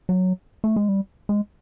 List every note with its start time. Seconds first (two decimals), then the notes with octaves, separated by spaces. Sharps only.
0.09 F#3
0.64 A3
0.76 G#3
0.89 G3
1.29 G#3